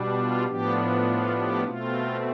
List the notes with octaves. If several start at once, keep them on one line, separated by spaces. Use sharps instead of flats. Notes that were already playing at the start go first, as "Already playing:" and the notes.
Already playing: B2 G3 D4
F4
A2 F3 B3 D4 G4
F4
G4
B2 A3 C4 F4